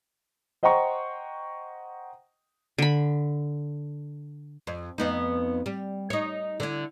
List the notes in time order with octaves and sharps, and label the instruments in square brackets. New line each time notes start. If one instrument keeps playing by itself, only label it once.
[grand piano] C5 D#5 F#5 G5 A#5 C#6
[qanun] D3 B5
[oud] F2
F2 B3 D#4
G3
D#4 C#5
D3 E4